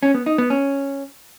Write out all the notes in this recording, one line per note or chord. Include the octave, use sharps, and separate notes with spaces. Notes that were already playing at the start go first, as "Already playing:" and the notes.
C#4
B3
D#4
B3
C#4